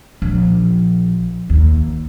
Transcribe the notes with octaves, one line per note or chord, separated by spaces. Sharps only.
A#1
D#2